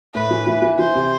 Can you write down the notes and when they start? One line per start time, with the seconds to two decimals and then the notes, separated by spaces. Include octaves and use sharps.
0.14 A2 B4
0.31 E3
0.47 E3
0.62 E3
0.79 E3 C5
0.95 C3